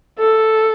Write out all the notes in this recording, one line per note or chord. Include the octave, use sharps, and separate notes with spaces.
A4